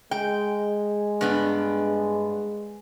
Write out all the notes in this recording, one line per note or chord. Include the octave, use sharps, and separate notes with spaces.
G#3 G5
G2 B3 D4